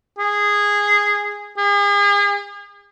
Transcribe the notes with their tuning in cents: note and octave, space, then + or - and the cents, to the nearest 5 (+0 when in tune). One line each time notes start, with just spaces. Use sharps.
G#4 -10
G#4 -40